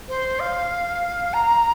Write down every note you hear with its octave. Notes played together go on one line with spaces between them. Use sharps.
C5
F5
A#5